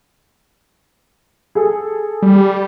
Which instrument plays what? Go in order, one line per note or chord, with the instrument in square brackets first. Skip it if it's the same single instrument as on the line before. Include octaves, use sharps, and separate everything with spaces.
[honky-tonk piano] G#4 A4
[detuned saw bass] G3